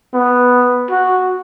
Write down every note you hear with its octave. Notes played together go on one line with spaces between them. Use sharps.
B3
F#4